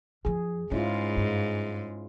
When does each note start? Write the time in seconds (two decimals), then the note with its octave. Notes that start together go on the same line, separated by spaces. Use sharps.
0.25 F#2 F3 G#4
0.72 G#2 G#3 A3 C#4 E4 F4
1.17 G2